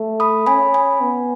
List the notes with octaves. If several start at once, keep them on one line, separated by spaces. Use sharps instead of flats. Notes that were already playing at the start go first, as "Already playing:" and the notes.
Already playing: A3
B5 D#6
C#4 G#5 B5
G#5 B5
B3